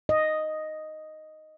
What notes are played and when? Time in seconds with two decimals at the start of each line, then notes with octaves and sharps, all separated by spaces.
0.09 D#5